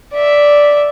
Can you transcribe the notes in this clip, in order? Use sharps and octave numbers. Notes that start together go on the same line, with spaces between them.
D5 E5